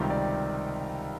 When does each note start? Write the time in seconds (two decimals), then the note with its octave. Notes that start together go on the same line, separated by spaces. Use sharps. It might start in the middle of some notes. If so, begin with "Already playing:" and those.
Already playing: C#2 C3 D#3 G3
0.10 D5